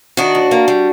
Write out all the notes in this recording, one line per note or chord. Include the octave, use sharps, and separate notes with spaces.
D#3 D4 F#4
D#2
A#3
G3